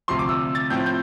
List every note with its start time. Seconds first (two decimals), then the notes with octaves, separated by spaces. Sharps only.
0.08 D2 C3 F3 C6
0.19 D6
0.29 E6
0.55 A6
0.70 A2 F3 C4 E4 G6
0.86 G6